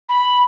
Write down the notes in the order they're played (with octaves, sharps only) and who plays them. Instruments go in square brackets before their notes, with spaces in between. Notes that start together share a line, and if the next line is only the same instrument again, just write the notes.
[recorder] B5